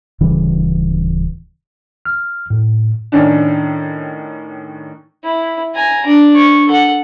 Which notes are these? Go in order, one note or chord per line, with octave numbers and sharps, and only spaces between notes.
D1 C#3 E3 G3
F6
A2
A2 D#3 C#4 D4
E4
G#5 A#5
D4
C#6
A4 F#5